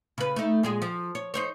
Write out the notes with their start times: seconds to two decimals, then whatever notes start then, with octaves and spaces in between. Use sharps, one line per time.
0.18 C#3 B4
0.36 A3 D#4
0.63 A#2 G#3 G#4
0.82 F3
1.15 C#5
1.34 D#4 C5 C#5